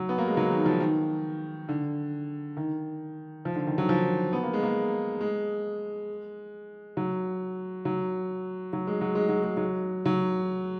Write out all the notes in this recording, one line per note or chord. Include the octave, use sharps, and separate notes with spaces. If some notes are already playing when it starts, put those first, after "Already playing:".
Already playing: F#3
B3
A#3
G#3
F#3
D#3
F3
D#3
D3
D#3
F3
D3
D#3
F#3
F3
B3
A#3
G#3
A#3
G#3
F#3
F#3
F#3
G#3
F#3
G#3
F#3
G#3
F#3
F#3